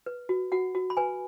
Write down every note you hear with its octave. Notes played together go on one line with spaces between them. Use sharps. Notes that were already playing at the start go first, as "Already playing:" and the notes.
B4
F#4
F#4 F#5
F#4
B5
B4 G#5